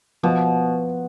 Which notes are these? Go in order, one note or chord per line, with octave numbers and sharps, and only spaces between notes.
B2 F3